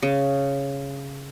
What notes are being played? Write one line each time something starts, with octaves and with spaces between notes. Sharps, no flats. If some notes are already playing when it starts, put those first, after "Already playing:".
C#3